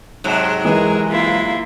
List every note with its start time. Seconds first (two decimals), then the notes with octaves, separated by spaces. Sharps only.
0.24 G#2 C3 F#3
0.64 E3 G#3 G#4 A#4
1.10 A#3 E4 F4